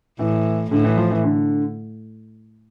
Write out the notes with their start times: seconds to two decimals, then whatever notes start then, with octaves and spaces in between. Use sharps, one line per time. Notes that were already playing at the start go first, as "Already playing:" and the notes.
0.19 A2 E3
0.71 A2 D3
0.84 E3
0.97 F3
1.11 E3
1.24 D3